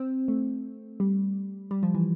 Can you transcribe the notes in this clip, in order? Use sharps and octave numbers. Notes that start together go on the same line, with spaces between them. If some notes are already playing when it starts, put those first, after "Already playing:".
Already playing: C4
A3
G3
G3
F3
E3